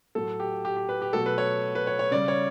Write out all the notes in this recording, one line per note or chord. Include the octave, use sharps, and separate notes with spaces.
A2 F#3 A3 A4
G4
G4
G4
B4
G4
B2 F#3 A3 A4
B4
C#5
B4
C#5
C#5
C#3 G3 D5
C#5